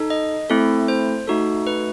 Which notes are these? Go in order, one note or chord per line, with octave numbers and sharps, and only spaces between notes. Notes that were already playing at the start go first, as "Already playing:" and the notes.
Already playing: D#4 A4
D#5
A3 C4 E4 A4
C5
A3 D#4 F#4 A4
B4